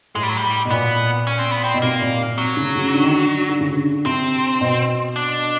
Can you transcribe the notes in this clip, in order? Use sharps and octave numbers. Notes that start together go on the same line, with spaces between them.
A2 G#3
G3
F#3
G3
B2
A#2 B3
C#4
C4
B3
C4
B2
C3 A#3
A#2
C3
F#3
C#3
C#3
D3
D#3
D3
D3
C#3
D3
C3 C4
B2
D4